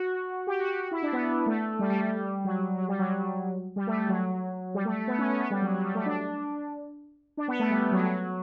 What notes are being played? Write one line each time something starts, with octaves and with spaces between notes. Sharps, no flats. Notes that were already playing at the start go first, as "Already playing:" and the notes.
Already playing: F#4
G4
F#4
G4
F#4
E4
D4
B3
A3
G3
G3
G3
G3
F#3
F#3
G3
F#3
G3
A3
G3
F#3
G3
A3
A3
B3
C#4
C#4
B3
G3
F#3
F#3
G3
A3
D4
D4
B3
A3
G3
G3
F#3
F#3